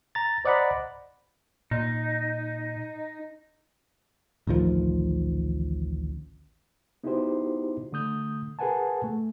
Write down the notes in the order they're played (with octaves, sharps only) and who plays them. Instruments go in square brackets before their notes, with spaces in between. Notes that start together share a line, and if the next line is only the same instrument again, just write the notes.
[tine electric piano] A#5 A6
C5 D5 D#5 F#5 A#5 B5
[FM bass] A#2 [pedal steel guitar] D#4
[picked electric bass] A1 D2 D#3 F3
[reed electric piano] B3 D#4 E4 F#4 G4 C5
D3 A3 D#6 G6
G#4 A#4 B4 F#5 G#5 A5
A3